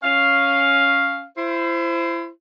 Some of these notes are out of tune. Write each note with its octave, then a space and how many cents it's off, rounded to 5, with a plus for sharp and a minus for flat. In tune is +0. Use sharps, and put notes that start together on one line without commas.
C#4 +0 F5 +0
E4 +35 C5 +0